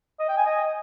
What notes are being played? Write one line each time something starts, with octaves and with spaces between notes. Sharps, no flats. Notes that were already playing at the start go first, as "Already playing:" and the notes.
D#5
G5
G#5
D#5